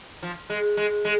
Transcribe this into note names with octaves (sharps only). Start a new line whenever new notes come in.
F3
G#3
G#3
G#3